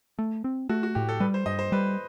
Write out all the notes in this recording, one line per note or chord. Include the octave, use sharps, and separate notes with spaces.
A3
C4
A3 F#4
F#4
A2 G4
A4
G3 B4
C5
G2 D#5
C5
G3 B4